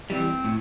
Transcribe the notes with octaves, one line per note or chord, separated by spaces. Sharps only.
E3 G3 C4
A2